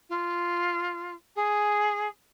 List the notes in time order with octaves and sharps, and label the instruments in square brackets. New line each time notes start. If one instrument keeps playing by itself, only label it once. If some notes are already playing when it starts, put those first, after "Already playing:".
[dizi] F4
G#4